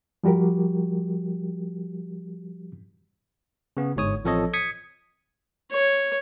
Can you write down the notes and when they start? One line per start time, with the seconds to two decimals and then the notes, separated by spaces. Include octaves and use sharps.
0.24 F3 G3 F#4 G4 A#4
3.77 C#3 B3
3.96 G1 G#2 C#5 D#6
4.25 A1 F3 C4 A4 C#5 D#5
4.54 D#6 G#6 B6 C#7
5.71 C#5